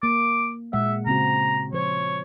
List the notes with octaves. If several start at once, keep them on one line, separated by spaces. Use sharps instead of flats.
A#3 D6
A#2 G#3 E5 F#5
C#3 C4 F#4 A#5
F3 C5 C#5